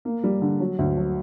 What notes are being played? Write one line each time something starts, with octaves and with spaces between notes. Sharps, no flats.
A#3
G3
D3
F#3
D2
F#3